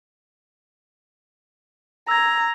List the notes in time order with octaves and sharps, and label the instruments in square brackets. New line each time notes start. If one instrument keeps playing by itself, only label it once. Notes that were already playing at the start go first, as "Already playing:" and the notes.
[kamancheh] A#5 [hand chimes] E6 G#6